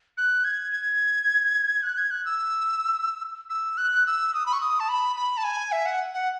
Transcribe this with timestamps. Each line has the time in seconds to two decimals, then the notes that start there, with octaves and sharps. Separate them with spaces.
0.18 F#6
0.44 G#6
0.72 G#6
1.83 F#6
1.98 G#6
2.11 F#6
2.25 E6
3.50 E6
3.78 F#6
4.06 E6
4.34 D#6
4.46 B5
4.53 C#6
4.61 D#6
4.80 A5
4.89 B5
5.16 B5
5.37 A5
5.44 G#5
5.72 E5
5.86 F#5
6.14 F#5